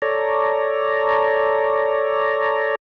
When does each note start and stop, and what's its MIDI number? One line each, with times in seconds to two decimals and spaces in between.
0.02 2.75 69
0.02 2.75 73
0.02 2.75 74
0.02 2.75 82